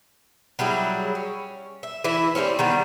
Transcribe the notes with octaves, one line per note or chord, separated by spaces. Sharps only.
F#3 G3 E4 G#4
C#4
E5
E3 E4 E5
G3 A#3 C4 C#4
D#3 G3 B3